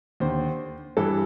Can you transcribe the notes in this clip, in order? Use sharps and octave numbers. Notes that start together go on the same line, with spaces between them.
D#2 D3 C5
G2 E3 A4